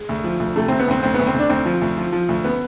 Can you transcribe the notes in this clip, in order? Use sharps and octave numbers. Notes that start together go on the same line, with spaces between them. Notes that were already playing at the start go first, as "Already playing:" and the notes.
Already playing: G#3
D2
F3
D2
C3 A3
C4
D2
B3
D2 C4
D2 C4
B3
D2
C4
D2 D4
D2 C4
F3
D2
F3
F3
D2
B3